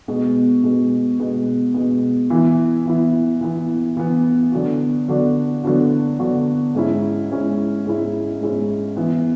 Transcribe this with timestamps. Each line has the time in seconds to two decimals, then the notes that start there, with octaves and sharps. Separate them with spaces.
0.08 B2 G#3 B3
0.64 B2 G#3 B3
1.20 B2 G#3 B3
1.74 B2 G#3 B3
2.30 E3 B3 E4
2.86 E3 B3 E4
3.41 E3 B3 E4
3.97 E3 B3 E4
4.52 D3 F#3 B3 D4 F#4
5.08 D3 F#3 B3 D4 F#4
5.64 D3 F#3 B3 D4 F#4
6.19 D3 F#3 B3 D4 F#4
6.75 G#2 G#3 C#4 E4
7.30 G#2 G#3 C#4 E4
7.85 G#2 G#3 C#4 E4
8.41 G#2 G#3 C#4 E4
8.96 E3 B3 E4